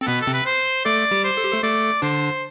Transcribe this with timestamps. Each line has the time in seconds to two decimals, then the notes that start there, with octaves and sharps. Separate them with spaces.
0.01 C4 A4
0.07 B2 B3 B4
0.21 A4
0.27 C3 C4
0.34 B4
0.46 C5
0.85 A3 A4 D5
1.11 G3 G4
1.24 C5
1.37 A4
1.44 G4
1.52 A3 A4
1.63 A3 A4 D5
2.02 D3 D4 C5